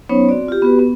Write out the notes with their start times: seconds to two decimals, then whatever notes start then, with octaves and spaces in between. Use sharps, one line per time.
0.09 F#3 B3 C#4 D#4 C5 C#5
0.29 C4 F#4 D5
0.48 F4 G4
0.62 B3 F#4 G4 B4
0.79 B3